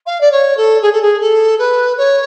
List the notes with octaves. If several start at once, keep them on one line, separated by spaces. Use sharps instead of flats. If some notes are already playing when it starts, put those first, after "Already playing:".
F5
D5
C#5
A4
G#4
A4
G#4
A4
B4
C#5